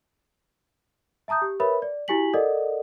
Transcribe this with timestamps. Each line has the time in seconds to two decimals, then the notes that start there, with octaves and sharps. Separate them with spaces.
1.28 E5 A5 A#5 D#6 G6
1.42 G4
1.60 A#4 B4 C#5 E5 B5
1.82 D5
2.08 E4 F#4 G4 G#5 B6 F#7
2.34 A4 A#4 D5 D#5 F#5